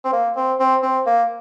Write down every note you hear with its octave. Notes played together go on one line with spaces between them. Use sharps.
C4
A#3
C4
C4
C4
A#3